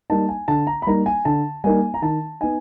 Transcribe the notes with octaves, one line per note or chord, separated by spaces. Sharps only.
G3 A#3 D#4 A5
G#5
D3 A5
A#5
B5
G3 A#3 D#4 A#5
G#5
D3 A5
G3 A#3 D#4 G#5
A#5
D#3 A5
B3 D#4 G#5